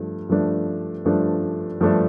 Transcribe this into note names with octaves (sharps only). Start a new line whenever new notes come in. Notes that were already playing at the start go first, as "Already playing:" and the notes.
Already playing: G2 F3 A3
G2 F3 A3 D4
G2 F3 A3 D4
G2 F3 A3 D4